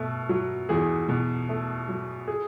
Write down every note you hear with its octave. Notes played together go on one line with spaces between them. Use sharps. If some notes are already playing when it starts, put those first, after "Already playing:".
Already playing: B2 A3
F#3
E2 G#4
B2
A3
F#3
G#4